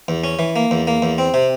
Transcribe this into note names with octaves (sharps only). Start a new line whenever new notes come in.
E2
C#4
E3
A#3
E2
A#3
E2
C4
C3